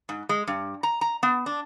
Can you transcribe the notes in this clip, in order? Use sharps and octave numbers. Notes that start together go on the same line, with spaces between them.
G#2
G#3
G2
A#5
A#5
B3
D4